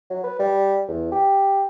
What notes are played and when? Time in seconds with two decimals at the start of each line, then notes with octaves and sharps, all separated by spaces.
0.10 F#3
0.24 B4
0.39 G3
0.88 E2
1.12 G4